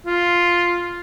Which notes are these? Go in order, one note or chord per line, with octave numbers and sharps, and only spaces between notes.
F4